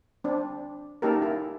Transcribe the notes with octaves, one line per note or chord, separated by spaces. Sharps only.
C4 D4
A#3 C#4 D#4 G4 A4 A#4
E4